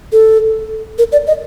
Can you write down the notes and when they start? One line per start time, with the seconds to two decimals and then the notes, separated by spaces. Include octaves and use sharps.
0.12 A4
0.98 A#4
1.12 D5
1.27 D#5